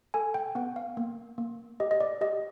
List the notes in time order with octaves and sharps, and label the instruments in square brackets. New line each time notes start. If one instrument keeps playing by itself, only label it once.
[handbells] A4 G#5
G5
B3 F#5
F5
A#3
A#3
G4 D#5
D#5
D5
G4 D#5